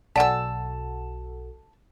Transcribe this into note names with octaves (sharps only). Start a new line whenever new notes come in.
B1 F#4 A4 D5 F#5 G#5 A5 E6